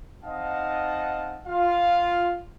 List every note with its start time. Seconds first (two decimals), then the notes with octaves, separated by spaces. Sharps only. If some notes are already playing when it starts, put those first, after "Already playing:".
0.24 C4 D#4 D#5 F5 F#5 A5
1.47 F4 F5